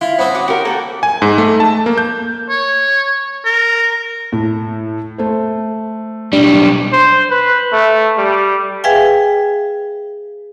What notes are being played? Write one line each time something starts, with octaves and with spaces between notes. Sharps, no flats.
E4 F4
C4 C#4 F#5 B5 D#6
F#4 D6 D#6
F#4 G4 A#4 F5
A#3 A4 F#5 G5
G#5
G#2
A3
A5
A#3
G6
C#5
A#4
A2
A3 C5
B1 G3 D4
C5
B4
A3
G3
G#4 B4 E5 F5 G5 G#5